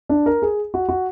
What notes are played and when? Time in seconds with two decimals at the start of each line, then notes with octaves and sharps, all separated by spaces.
0.09 D4
0.26 A#4
0.42 G#4
0.74 F#4
0.89 F#4